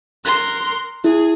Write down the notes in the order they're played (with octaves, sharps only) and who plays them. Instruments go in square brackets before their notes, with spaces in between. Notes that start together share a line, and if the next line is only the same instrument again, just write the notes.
[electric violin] A#4 C6 [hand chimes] F#6
[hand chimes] E4 [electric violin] G#4